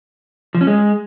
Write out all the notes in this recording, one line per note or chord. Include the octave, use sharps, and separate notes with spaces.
F3
C#4
G#3